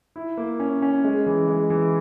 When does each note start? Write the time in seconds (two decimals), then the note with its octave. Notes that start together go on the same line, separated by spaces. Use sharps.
0.16 E4
0.37 A#3
0.60 C#4
0.82 C#4
1.04 G#3
1.26 E3
1.48 G#3
1.70 E3